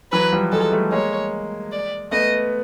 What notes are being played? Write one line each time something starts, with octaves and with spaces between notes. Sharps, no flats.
E3 F#3 B4
F3 G3
F#3 G#3 A4
G3 A3
G#3 A#3 C#5
D5
A3 B3 D#5